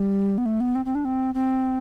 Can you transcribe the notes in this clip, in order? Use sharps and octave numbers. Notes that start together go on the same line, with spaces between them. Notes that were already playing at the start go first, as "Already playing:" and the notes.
Already playing: G3
B3
A3
B3
C4
C4
D4
C4
C4